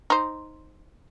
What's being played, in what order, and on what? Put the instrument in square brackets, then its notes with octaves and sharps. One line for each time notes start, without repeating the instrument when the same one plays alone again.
[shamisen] D#4 C5